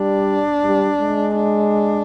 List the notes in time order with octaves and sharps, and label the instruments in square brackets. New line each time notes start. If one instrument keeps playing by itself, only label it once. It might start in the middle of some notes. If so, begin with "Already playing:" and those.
Already playing: [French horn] G3 [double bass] D4
[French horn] G3
G#3
[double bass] D4